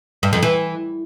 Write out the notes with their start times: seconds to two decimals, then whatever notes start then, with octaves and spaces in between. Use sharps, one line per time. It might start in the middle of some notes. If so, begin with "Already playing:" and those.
0.23 G2
0.33 F2
0.43 E3